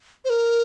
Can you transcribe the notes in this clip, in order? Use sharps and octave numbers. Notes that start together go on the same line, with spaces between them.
C5
A#4